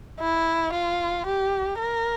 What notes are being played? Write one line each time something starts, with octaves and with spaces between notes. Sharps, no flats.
E4
F4
G4
A#4